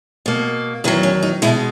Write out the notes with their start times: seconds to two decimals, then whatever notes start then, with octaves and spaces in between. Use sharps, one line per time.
0.26 B2 A#3
0.84 E2 D#3 F#3 B4
1.03 C#4
1.22 D#4
1.42 B2 G#3 E4